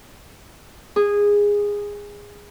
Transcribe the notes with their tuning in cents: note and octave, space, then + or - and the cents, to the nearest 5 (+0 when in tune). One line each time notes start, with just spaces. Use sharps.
G#4 -15